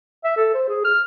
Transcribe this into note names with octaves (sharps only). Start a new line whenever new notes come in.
E5
A4
C5
G#4
F6